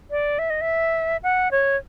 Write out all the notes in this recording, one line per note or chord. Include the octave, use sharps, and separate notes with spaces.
D5
E5
D#5
E5
F#5
C#5